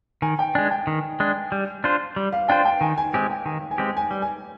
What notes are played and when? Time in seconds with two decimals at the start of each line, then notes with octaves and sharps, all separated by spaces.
0.22 D#3 G#5
0.39 G5
0.55 G#3 D4 G#5
0.71 G5
0.87 D#3
1.20 G#3 D4
1.52 G3
1.84 D4 F4 C5
2.16 G3
2.32 F5
2.49 D4 F4 C5 G5
2.65 G5
2.81 D#3 G#5
2.98 G#5
3.14 G#3 C4 G4 G#5
3.30 G5
3.46 D#3 G#5
3.71 G#5
3.78 G#3 C4 G4
3.97 G#5
4.11 G3
4.22 G#5